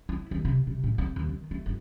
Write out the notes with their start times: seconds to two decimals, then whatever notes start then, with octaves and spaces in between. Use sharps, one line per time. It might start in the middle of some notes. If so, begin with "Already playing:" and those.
0.09 E4
0.31 D#2
0.45 C3
0.67 C3
0.84 A2
0.98 C4
1.16 D#2
1.29 D#3
1.51 A3
1.66 G1